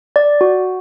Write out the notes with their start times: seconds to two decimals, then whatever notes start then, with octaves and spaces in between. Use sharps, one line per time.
0.16 D5
0.41 F#4